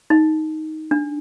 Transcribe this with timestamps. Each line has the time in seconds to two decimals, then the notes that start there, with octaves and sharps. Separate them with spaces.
0.10 D#4
0.91 D4